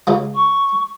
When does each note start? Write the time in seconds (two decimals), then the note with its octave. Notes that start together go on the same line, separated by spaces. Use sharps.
0.07 C#2 C#3 G#3
0.34 C#6